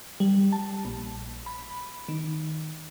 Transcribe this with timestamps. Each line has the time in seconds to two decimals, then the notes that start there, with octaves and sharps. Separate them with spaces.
0.20 G3
0.52 A5
0.85 A#1
1.46 B5
2.09 D#3